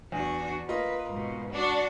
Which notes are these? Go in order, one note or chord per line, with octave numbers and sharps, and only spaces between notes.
E2 D4 F#4
A#3 F4 B4 D#5
G#2 B2
D4 F#4 F#5